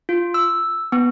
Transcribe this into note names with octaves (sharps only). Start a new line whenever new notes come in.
F4
E6
B3